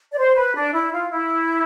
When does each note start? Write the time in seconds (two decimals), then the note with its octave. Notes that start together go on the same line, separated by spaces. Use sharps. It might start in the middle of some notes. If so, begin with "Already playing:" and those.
0.12 D5
0.17 C5
0.35 B4
0.55 D4
0.73 E4
0.92 F4
1.11 E4